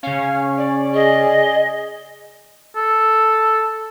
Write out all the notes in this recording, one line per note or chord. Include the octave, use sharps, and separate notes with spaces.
C#3 C#4 F5
D5
G#4 D#5
A4